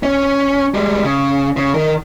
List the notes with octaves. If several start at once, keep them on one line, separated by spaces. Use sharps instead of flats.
C#4
G3 G#3
C#3
C#3
D#3 A#4